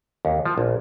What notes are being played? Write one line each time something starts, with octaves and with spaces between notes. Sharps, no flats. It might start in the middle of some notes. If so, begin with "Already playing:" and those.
D#2
F3
A#1